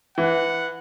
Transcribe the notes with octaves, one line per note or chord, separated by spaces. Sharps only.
E3 F#5